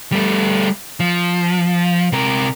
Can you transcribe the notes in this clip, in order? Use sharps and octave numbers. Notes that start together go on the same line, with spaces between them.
G3 A3
F3
C3 A#4